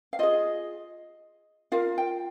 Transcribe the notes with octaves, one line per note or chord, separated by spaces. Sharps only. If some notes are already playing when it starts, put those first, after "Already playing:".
F5
F4 G#4 D#5
F4 A#4 F5
G5